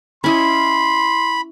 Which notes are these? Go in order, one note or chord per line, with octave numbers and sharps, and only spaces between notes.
C#4 E4 D#5 B5 C6